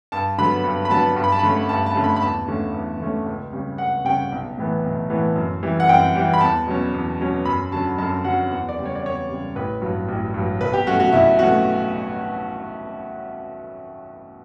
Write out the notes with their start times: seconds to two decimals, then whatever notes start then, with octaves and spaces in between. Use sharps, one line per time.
0.12 G2 A5
0.38 D3 F#3 B3 B5
0.64 G2
0.85 B5
0.90 D3 F#3 B3 A5
1.16 G2
1.24 B5
1.32 A5
1.39 B5
1.43 D3 A3 C#4
1.69 G2 A5
1.86 A5
1.96 D3 A3 C#4
2.04 B5
2.16 B5
2.22 E2 A5
2.48 D3 A3 C#4
2.74 E2
3.00 D3 A3 C#4
3.26 C#2
3.52 C#3 G3 C#4
3.78 C#2 F#5
4.05 C#3 G3 C#4 G5
4.32 B1
4.57 A2 E3 B3
4.84 B1
5.10 A2 E3 B3
5.36 F#2
5.63 E3 G3
5.80 F#5
5.89 F#2 G5
6.16 E3 G3
6.33 B5
6.41 E2 A5
6.67 B2 F#3 C#4
6.94 E2
7.20 B2 F#3 C#4
7.45 F#2 B5
7.72 D3 F#3 C#4 A5
7.98 F#2 A5
8.24 D3 F#3 C#4 F#5
8.50 E2 F#5
8.69 D5
8.78 C#3 G3
8.86 C#5
8.95 D5
9.03 E2 C#5
9.29 C#3 G3
9.55 A1 B4
9.81 G2 F#3
10.09 A1
10.34 G2 F#3
10.61 B1 B4
10.73 G4
10.87 B2 F#3 A3 C#4 F#4
11.00 F#4
11.13 B1 E4
11.39 B2 F#3 A3 C#4 F#4